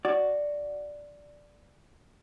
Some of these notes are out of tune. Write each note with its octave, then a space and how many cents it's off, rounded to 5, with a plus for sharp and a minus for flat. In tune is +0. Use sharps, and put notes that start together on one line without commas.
F#4 +0 D5 +0